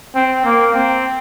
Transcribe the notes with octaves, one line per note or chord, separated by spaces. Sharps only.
C4
A#3
C4